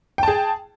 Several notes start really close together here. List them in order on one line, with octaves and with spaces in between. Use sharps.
G5 A5 G#4